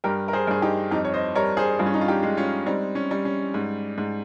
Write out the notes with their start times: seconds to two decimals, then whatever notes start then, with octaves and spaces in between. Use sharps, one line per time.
0.04 G2 G4 A#4
0.28 A#4
0.33 G#4 C5
0.47 G2 G#4
0.62 D#4 G4
0.91 F2 D#4 G4
1.05 C#5
1.14 C5 D#5
1.35 G3 A#4 C#5
1.57 G#4 C5
1.79 G2 F4 G#4
1.86 C#4
1.94 D#4
2.01 F4
2.08 D#4 G4
2.23 G#3
2.37 C#4 F4
2.66 G3 C4 D#4
2.95 C#4
3.11 G3
3.25 C#4
3.54 G#2
3.98 G#2